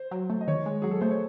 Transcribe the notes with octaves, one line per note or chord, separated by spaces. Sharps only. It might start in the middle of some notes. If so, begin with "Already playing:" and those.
Already playing: C5
F#3
A3
D#5
D#3 C#5
G#3
F#3 G#4
A4
A3 C5
C#5